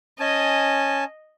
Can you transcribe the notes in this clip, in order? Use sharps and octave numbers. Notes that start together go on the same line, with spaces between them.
C#4 D#5 G#5 A5